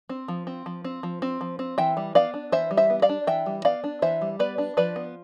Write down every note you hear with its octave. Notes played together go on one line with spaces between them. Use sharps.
C4
F3
C4
F3
C4
F3
C4
F3
C4
E3 E5 G5
G3
B3 D5 F5
D4
E3 C5 E5
G3
C5 E5
B3
D5 F5
D4
E3 E5 G5
G3
B3 D5 F5
D4
E3 C5 E5
G3
B3 B4 D5
D4
F3 B4 D5
B3